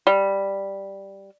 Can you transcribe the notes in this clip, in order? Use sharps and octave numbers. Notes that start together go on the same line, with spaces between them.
G3